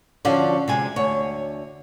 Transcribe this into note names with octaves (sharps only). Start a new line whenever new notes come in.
D3 F3 C#4 F4 F#4 D5
C3 G#3 G#5
D2 C#5